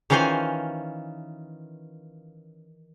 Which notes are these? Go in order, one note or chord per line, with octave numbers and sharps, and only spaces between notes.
D#3 E3 C#4 F4 C5 G#5